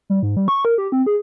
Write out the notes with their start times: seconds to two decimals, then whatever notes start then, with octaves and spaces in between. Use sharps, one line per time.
0.10 G3
0.23 G#2
0.37 G3
0.48 C#6
0.65 A#4
0.78 G4
0.92 C4
1.06 G#4